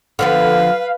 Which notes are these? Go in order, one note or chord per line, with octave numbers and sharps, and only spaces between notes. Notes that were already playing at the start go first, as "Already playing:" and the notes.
D3 F3 B3 B4 F5